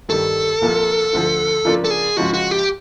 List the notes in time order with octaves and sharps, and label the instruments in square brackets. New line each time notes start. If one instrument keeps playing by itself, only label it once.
[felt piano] G2 D#3 G3 [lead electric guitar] A4
[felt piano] C2 A#2 F3 A#3
D2 D3 F3
C#3 F3 A#3 D4 F4
[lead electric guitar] A4
G#4
[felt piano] C#2 C#3 F3 G#3 [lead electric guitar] F#4
[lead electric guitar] F#4
G4